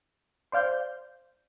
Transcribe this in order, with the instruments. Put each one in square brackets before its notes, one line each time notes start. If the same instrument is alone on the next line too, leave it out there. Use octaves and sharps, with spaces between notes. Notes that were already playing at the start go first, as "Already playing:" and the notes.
[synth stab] C5 D5 F5 G6